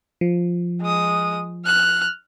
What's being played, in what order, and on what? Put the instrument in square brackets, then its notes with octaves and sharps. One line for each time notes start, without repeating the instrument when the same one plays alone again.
[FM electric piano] F3
[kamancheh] G#3 D#6
F6 F#6